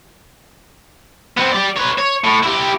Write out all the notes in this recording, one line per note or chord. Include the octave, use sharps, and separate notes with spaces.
B3 C4
G4 D5
B4 C#5
C#5
A2
E4 G4